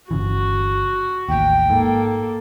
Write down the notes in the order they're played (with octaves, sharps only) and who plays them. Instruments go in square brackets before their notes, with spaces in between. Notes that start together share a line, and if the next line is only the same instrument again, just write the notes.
[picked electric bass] G1 C#3 E3 [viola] F#4
[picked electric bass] A1 D#2 [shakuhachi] G5
[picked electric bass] G#2 [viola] A#3 A4